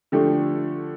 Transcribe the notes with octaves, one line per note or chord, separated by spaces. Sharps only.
D3 F3 A3 D4 G4